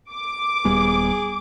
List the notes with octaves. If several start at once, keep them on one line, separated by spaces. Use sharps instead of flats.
D6
D#1 G3 B3 G#4